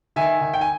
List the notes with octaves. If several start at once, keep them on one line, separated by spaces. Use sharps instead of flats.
D#3 E5 G#5
D#3
G5
G#5